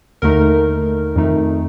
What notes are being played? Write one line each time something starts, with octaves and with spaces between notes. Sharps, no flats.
D#2 D3 A3 D#4 A#4
F2 D#3 A3 D#4